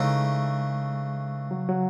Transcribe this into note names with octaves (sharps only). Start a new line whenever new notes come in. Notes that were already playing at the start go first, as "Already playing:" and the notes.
Already playing: C#3 E3 G#3 A3 D#4
F#3
F#3